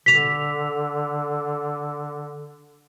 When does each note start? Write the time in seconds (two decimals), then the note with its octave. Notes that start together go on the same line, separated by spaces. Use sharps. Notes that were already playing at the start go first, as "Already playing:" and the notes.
0.06 D3 B6 F7